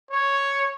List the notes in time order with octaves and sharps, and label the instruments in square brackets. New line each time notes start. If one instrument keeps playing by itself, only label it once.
[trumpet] C#5